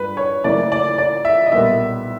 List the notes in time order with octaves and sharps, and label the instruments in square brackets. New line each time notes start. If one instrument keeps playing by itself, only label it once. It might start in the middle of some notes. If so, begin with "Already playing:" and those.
Already playing: [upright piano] G2 G3 B4
C#5
F#1 F#2 C#3 E3 A3 D5
D5
D5
E5
D#5
B1 A#2 G3 B3 E5